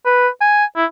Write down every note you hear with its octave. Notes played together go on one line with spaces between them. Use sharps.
B4
G#5
E4